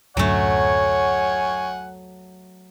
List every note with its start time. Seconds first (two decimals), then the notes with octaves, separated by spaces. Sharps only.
0.17 D1 F#2 D3 F#3 A3 C#5 F#5 G#5